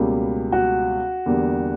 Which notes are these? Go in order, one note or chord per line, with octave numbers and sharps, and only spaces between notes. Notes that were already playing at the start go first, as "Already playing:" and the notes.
Already playing: C#2 B2 G3 A#3
F#4
E2 D3 G3 A#3